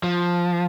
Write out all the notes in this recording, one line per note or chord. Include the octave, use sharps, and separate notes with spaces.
F3